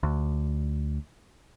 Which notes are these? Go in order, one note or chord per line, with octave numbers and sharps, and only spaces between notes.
D2